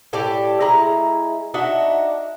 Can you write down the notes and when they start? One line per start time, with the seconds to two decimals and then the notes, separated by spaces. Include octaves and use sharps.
0.13 A2 G4 A4 D5
0.61 G#3 E4 A#5
1.54 D4 D#4 F#4 E5